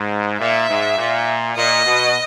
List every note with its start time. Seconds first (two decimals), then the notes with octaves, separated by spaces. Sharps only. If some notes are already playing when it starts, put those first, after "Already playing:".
Already playing: G#2
0.40 A#2 E5
0.70 G#2
0.98 A#2
1.57 A#2 D#5
1.86 B2